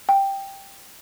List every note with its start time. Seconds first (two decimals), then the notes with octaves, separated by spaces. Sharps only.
0.09 G5